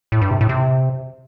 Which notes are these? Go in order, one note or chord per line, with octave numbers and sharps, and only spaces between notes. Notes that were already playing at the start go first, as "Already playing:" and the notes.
A2
G2
C3
A2
C3